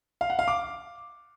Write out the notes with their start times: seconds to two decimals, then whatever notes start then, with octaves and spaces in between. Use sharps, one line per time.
0.21 F5
0.30 F#5
0.39 F5
0.48 D6